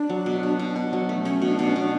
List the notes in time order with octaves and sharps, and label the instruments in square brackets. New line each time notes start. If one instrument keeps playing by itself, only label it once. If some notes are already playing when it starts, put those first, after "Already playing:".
Already playing: [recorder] D4
[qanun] F#3
B2
B2
B2
B2
F#3
A3
[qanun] A3 [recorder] C#4
[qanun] B2
[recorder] D4
[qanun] B2 [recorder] D4
[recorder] C#4
[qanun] B2
[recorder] D4